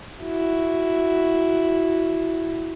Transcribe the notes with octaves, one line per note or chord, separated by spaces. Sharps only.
E4 F#4